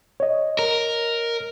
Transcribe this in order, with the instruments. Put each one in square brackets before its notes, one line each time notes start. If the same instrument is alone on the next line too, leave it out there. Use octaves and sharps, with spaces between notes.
[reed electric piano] C#5 D#5
[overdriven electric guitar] A#4